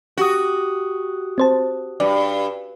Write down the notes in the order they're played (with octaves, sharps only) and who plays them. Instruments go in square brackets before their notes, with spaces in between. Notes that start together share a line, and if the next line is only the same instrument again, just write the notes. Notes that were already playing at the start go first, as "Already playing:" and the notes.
[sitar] F#4 [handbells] G4 D#6
[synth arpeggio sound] C4 C5 A5
[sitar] G2 [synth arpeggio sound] D5